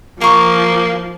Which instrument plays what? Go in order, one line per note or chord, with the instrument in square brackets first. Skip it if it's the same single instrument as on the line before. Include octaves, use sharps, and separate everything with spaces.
[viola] F3 [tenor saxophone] A#3 [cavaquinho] A#5 C#6